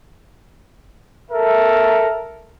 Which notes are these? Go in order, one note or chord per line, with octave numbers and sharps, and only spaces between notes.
A4 A#4 E5